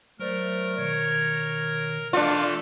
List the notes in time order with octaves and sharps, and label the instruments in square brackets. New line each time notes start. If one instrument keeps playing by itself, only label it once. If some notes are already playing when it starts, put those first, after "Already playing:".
[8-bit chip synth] F#3 C5 D5 [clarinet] A3 [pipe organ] A#4
[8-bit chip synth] B2 D#3 [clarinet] C#5
[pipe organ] E3 A3 A4 [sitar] D4 F4 [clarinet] D5